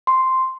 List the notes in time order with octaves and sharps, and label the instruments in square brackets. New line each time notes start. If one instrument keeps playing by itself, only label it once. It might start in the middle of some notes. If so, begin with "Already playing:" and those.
[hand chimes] C6